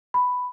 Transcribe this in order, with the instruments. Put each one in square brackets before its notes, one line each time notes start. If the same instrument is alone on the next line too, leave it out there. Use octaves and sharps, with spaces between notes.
[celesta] B5